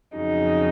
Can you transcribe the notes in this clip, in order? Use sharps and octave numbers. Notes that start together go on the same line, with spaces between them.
F2 C#3 F#3 D#4